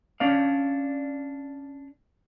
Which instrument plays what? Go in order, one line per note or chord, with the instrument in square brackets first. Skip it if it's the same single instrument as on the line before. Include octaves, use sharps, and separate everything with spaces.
[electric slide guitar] C#4 D4 D5 F5